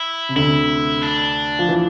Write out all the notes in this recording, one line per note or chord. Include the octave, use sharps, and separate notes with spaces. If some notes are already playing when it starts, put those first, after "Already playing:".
Already playing: E4
C3
D2 D3 E4
D4
F3
E3